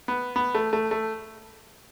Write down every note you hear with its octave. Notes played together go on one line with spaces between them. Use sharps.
B3
B3
A3
A3
A3